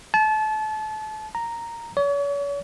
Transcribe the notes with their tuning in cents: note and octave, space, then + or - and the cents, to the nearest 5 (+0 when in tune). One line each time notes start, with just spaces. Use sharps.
A5 -30
A#5 -5
C#5 +40